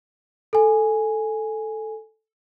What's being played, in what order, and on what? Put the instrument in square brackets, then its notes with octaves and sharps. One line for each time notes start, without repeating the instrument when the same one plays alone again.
[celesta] A4 G#5